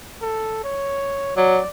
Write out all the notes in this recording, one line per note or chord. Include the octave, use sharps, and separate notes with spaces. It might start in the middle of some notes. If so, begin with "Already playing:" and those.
A4
C#5
F#3 D5